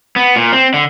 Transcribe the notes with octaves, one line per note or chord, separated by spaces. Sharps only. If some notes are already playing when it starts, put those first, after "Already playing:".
B3
A#2
C4
D3